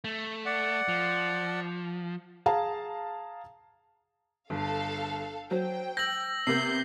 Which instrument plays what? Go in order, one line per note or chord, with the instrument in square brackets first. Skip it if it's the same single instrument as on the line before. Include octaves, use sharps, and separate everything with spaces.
[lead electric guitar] A3
[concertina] D5 F#5
[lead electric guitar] F3
[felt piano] G#4 F5 A5 A#5
[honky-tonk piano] G1 [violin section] A4 F5
[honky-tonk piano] F#3 [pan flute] C5 [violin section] G5
[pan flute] E6 [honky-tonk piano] G6 [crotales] A#6 F#7
[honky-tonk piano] C3 A#3 B3 [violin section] G6 [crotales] C7